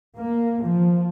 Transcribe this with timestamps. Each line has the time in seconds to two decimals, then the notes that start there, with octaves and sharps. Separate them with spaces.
0.17 A#3
0.64 F3